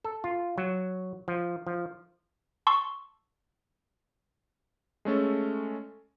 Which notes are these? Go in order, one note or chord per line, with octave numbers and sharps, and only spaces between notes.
A4
F4
F#3
F3
F3
A5 C6 C#6 E6
G#3 A3 C#4 A4